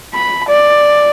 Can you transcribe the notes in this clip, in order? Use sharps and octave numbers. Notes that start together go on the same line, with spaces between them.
B5
D5